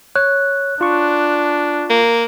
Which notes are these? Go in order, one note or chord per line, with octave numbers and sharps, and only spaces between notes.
C#5 F#6
D4 F4 C#6
A#3